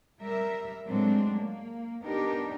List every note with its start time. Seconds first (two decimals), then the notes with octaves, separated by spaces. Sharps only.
0.22 G3 A#4 E5
0.87 A2 F#3 G#3 C4 D4
1.38 A#3
2.03 B3 D4 D#4 G4 A#4